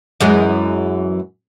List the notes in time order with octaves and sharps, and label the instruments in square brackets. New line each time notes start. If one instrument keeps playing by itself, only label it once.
[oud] F#2 E3 G#3